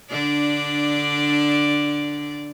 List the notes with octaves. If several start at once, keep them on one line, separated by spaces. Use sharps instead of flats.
D3 D4 D5